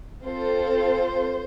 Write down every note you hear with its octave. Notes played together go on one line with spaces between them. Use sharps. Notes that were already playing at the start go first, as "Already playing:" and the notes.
C4 F4 A4 C5